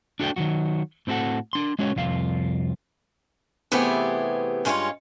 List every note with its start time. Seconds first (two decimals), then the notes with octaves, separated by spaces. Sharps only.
0.20 D4 F#4 A4 D5 G5
0.36 D#3 F3 F#3 F#4
1.07 A2 C4 E4 F#4 A4 F#5
1.53 D4 C6
1.79 G#3 C#4 F#4 C#5
1.96 C2 F2 F4 F5
3.72 C3 E3 A3 B3 G4 G#4
4.65 G2 G#3 C#4 F4 B4 C#5